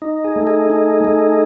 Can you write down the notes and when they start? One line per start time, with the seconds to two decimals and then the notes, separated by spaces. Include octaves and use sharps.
0.02 D#4
0.24 G#4
0.36 A3
0.47 G#4
0.70 D#4
1.05 A3